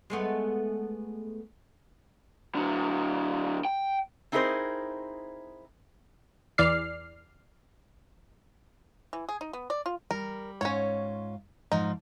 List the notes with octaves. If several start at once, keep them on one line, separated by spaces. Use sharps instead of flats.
G#3 A3 B3
D3 F#3
G5
C4 D#4 E4 G#4 A#4 C5
E2 E3 D5 F6 C7
E3
G#4
D#4
B3
D5
F4
G3 A#4
G#2 C#4 F4 C#5
G#2 F3 D#4